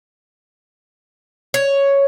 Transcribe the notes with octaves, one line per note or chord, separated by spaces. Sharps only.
C#5